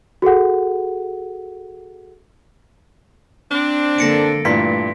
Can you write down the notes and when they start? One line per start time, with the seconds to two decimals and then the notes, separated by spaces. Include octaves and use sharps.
0.22 F#4 G#4 A4 F#5
3.52 C4 D4
3.98 D3 A#3 A4 A#6 C#7 D7
4.45 G2 A#2 E3 A3 C6 B6